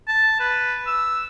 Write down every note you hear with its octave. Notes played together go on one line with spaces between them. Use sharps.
A5
B4
E6